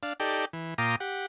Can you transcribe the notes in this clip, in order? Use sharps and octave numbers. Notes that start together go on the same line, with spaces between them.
D4 F5
D#4 G4 A4 D5 G5
E3
A#2 F4 G5 A#5 D6 D#6
G4 F#5